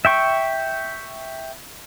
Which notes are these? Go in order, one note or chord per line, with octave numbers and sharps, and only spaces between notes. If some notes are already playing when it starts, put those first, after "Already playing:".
E5 G5 C#6